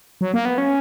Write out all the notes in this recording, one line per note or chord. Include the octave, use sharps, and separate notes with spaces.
F#3
A#3
B3
C#4